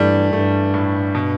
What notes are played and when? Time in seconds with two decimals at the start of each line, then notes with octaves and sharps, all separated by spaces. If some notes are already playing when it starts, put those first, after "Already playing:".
Already playing: G2 E3 G3 A3
0.33 G2 A3
0.74 A2
1.15 B2